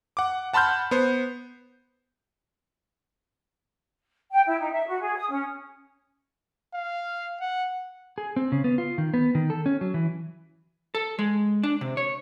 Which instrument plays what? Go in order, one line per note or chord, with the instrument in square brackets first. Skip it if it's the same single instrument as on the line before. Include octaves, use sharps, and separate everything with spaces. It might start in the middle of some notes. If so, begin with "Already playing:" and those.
[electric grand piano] F#5 D6
F#5 A5 B5 C6 F6 G6
B3 C5
[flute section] G5
E4
D#4
E5
F#4
G#4
D#6
C#4
[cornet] F5
F#5
[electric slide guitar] G#4
C4
C#3
B3
F4
D#3
B3
D#3
A4
C#4
F#3
E3
[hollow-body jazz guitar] A4
G#3
D4
C3
C#5